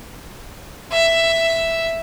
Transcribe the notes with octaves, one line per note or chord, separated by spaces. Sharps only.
E5